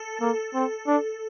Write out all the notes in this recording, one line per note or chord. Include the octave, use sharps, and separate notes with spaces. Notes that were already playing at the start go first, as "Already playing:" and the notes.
Already playing: A4
A#3
C4
D4